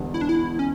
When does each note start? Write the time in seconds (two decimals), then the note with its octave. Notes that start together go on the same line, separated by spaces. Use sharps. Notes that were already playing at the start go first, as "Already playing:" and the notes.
Already playing: E1 E2 D3 G3
0.14 E4
0.21 D4
0.29 E4
0.59 C#4